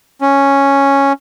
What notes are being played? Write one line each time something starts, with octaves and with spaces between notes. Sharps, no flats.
C#4